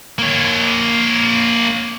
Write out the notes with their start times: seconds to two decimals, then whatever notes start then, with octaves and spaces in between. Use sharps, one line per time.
0.19 A#3 C#5